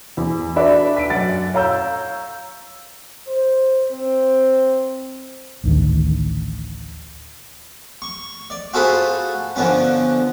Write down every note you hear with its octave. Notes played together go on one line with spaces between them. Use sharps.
E2
D4 F#4 A4 B4 D5 E5
B6 D7
F#2 F#5 A6
C#5 F5 A#5 E6 G6
C5
C4
A1 D2 D3 D#3
C#6
D5
F4 F#4 G#4 A4 B4 C5
D3 F3 B3 C#4